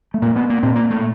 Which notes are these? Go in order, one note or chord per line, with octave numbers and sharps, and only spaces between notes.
A3
A#2 A#3
B3
A#3
A#2 C4
A#3
A3